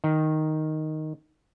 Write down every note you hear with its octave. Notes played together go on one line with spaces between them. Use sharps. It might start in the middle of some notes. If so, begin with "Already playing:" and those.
D#3